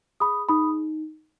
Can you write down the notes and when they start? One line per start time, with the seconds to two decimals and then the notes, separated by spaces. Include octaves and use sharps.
0.20 G#4 B5 D#6
0.49 D#4 B5 D#6